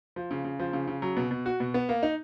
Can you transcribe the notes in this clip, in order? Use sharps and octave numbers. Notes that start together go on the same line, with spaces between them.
F3
C#3
C#3
F3
C#3
C#3
F#3
B2
B2
F#4
B2
B3
A#3
D#4